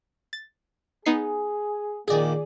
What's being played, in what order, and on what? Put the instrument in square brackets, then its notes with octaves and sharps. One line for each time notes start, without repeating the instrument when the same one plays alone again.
[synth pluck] A6
[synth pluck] B3 D#4 C7 [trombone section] G#4
[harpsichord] A#1 D#3 [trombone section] A#3 [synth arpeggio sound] G#4 D5